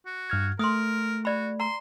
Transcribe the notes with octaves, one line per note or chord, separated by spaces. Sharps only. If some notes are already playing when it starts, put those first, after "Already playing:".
F#4
G2 F6 G#6
A3 A#4 C6 D#6
F#4 D5 B5
A#5 C6